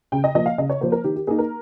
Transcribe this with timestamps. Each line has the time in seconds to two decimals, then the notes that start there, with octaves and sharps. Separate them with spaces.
0.12 C#3 G5
0.24 D#5
0.35 F3 A#3 D#5
0.46 F5
0.58 C#3 D#5
0.70 C#5
0.81 F3 A#3 C5
0.92 A#4
1.04 D#3 G4
1.16 G4
1.27 A#3 D#4 G#4
1.39 A#4